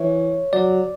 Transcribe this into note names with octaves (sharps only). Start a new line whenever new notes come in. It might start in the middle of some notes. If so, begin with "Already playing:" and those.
Already playing: E3 C#5
F#3 D5